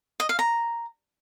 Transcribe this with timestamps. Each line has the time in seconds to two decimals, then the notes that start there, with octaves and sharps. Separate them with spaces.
0.20 D#5
0.29 F5
0.39 A#5